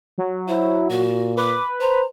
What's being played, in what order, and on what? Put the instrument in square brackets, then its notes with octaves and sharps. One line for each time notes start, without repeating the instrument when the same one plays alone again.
[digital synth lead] F#3
[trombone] E4 [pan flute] C5
[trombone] A#2 [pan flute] F#4
[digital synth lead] B4 [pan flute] D6
[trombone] C5 [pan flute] A#5